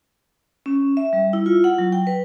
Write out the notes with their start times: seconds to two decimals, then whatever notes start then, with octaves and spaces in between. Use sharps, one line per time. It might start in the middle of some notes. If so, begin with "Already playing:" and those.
0.66 C#4
0.97 E5
1.13 G3
1.33 E4
1.46 F4
1.64 F#5
1.78 F#3
1.92 G5
2.07 B4